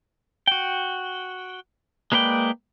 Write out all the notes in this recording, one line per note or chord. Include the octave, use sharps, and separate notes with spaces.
F#4 G5
G#3 A#3 B4 D5 G5